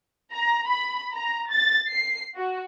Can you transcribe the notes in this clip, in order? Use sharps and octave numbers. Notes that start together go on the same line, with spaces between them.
A#5
B5
A#5
A6
C7
F#4